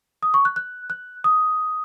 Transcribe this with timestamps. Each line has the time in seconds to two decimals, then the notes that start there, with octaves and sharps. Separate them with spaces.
0.23 D#6
0.34 C#6
0.45 F#6
0.56 F#6
0.90 F#6
1.24 D#6